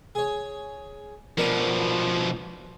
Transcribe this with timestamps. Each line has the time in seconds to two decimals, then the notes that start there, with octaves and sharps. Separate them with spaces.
0.15 G#4 C#5
1.38 B2 F3 A#4 B4 D5